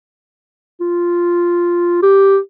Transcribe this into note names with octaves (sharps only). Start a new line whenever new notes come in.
F4
G4